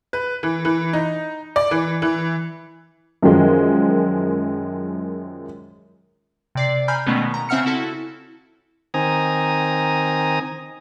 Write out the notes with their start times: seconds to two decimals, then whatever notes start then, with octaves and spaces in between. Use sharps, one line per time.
0.13 B4
0.43 E3
0.65 E3
0.93 D#4
1.56 D5
1.71 E3
2.02 E3
3.23 F#2 D#3 F3 G#3
6.55 C3 D5 C7
6.88 G#5 A#5 B5 F6 G6
7.06 B2 D#3 G#3 A3 B3 C#4
7.34 A#5
7.49 C#3 C4 E5 F#5 F6 C#7
7.66 E4 F#4 A4 A5
8.94 D#3 C4 G#5 A#5 D#6